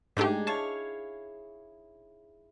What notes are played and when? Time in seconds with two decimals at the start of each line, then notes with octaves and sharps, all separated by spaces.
0.17 G#2 A3 D4 D#4 G4 G#4
0.47 E4 C#5 F5 A5